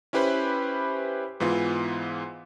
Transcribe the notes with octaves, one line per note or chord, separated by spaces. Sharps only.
C#4 E4 G4 B4 C5 B5
G#2 E3 B3 F4